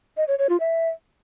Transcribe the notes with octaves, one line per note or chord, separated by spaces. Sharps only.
D#5
C#5
C#5
F4
E5